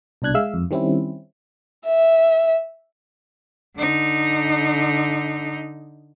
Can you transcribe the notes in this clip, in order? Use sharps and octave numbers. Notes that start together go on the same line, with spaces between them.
C2 B2 D4 F#6 G#6
G#3 E5 F5 E6
F2
D#3 G3 C4 C#4 E4
E5
D3 D#4